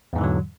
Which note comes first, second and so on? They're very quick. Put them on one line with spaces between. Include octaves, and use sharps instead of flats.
E2 G#2 E3 D3 F#3